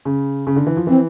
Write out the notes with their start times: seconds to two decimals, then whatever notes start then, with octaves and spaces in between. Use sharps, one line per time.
0.05 C#3
0.47 C#3
0.56 D3
0.67 E3
0.77 F3
0.87 E3 C4